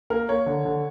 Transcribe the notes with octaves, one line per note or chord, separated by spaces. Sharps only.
A#3 A#4
A#3 C#5
D3
D3